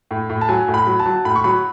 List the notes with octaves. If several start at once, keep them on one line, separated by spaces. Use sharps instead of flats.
A2
A2
A5
F#3 G#5
A2
B5
F#3
A5
F#3
A2 B5
C#6
F#3 B5